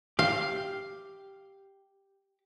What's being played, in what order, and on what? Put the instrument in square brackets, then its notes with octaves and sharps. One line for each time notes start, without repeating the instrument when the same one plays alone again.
[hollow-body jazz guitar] G4 [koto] F5